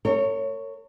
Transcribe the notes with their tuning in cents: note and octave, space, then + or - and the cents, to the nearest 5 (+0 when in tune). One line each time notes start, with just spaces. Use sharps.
A#4 -45 C#5 +0